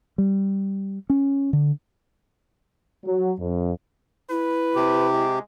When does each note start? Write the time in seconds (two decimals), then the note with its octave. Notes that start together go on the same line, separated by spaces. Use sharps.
0.18 G3
1.10 C#4
1.53 D3
3.05 F#3
3.40 F2
4.30 E4 B4
4.76 C3 G4
5.12 G#3